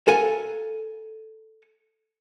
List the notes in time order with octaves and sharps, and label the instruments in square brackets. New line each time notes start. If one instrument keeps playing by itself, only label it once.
[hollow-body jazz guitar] A4 A#4 F5 F#5 G#5